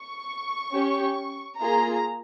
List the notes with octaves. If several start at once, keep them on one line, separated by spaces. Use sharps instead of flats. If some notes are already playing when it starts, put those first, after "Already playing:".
Already playing: C#6
C#4 G4
A#3 F4 G#4 A#5